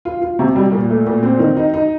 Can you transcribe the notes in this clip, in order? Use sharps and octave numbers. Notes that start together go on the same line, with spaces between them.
F4
F4
C3
G3
A#2
A3
A#2
C4
D#3
D#4
D#4